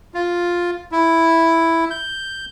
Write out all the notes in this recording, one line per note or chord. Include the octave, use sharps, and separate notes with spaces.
F4
E4
G6